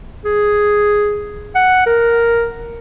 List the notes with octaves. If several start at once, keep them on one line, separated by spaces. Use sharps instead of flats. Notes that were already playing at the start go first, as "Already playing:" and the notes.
G#4
F#5
A#4